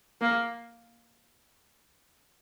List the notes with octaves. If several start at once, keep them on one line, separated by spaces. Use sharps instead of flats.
A#3